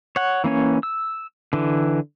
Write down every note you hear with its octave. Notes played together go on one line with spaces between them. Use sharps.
C#5 F#5
E3 A#3 C#4 C#5
E6
D3 E3